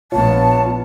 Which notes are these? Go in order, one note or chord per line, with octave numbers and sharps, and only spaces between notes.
A#1 B3 F4 C#5 A5